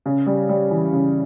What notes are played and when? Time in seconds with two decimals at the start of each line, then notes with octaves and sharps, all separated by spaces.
0.06 C#3
0.26 G3
0.49 G3
0.71 E3
0.93 C#3